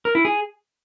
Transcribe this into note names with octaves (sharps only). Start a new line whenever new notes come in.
A#4
E4
G#4